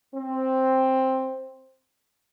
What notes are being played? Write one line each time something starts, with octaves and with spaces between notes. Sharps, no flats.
C4